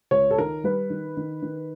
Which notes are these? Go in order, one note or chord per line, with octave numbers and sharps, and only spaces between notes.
C#2 C#5
A4
D#3 A#4
G3 B4
D#3
D#3
D#3